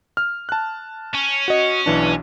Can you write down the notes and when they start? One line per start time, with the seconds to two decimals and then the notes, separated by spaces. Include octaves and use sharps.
0.17 F6
0.49 A5 F#6
1.15 C#4
1.48 F#4 D#5
1.86 B1 E3 D4